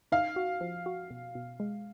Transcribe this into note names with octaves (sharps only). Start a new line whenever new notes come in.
D#4 F5
F#4
F3
F#4
B2
B2
G#3